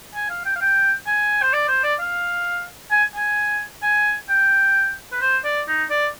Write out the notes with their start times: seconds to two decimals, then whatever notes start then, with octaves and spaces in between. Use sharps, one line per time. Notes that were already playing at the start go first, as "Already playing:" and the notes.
0.14 G#5
0.30 F5
0.45 G5
0.56 F5
0.61 G5
1.07 G#5
1.42 C5
1.53 D5
1.68 C5
1.83 D5
1.99 F5
2.91 G#5
3.15 G#5
3.83 G#5
4.29 G5
5.12 B4
5.21 C5
5.44 D5
5.68 D#4
5.90 D5